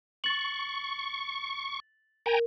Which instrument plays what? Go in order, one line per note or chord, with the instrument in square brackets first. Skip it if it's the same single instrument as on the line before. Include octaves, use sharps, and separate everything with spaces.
[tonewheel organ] C#6 [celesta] A6 F#7
[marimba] A#4 [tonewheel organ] G5 G#5 A#5